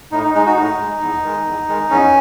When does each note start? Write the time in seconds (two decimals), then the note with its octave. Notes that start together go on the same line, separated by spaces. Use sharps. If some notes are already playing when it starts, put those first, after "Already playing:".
0.11 A2 D#4
0.23 D#4
0.34 G#3 D#4
0.46 D#4 F#4
0.56 A2 D#4
0.79 G#3
1.01 E2
1.23 D#3 G#3
1.46 E2
1.68 D#3 G#3
1.90 E2 C#4